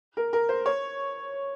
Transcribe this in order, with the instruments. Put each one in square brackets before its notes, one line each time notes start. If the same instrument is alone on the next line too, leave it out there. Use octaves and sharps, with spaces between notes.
[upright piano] A#4
A#4
C5
C#5